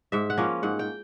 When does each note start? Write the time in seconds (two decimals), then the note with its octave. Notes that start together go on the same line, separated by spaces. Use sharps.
0.12 G#2 E5
0.30 F#5
0.38 F3 A#3 C#4
0.63 G#2 F#5
0.79 G5